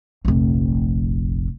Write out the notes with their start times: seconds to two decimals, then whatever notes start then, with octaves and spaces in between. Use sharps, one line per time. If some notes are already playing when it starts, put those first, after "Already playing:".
0.25 F1 A#1